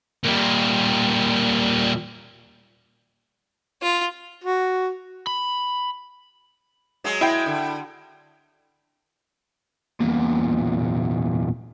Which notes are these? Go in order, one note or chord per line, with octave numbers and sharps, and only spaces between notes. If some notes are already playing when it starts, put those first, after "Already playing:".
A#2 G3
F4
F#4
B5
F#3 G#3
E4 G5
D3
E2 A#2